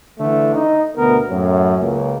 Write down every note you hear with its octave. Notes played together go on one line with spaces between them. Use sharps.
D3 E3 A3 D4
D#4
D2 B2 B3 A#4
F#2 A2
C#2 A#3